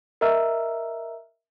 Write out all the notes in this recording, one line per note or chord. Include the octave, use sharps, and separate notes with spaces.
A#4 D#5 E5 A#5 E6 F6